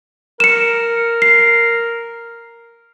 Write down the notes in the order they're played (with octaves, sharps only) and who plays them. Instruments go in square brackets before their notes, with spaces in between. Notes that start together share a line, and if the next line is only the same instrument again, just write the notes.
[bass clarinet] A#4 [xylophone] C#7 E7
[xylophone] C7